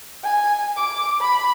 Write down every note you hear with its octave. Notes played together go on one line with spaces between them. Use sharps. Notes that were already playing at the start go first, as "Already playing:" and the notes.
G#5
D6
B5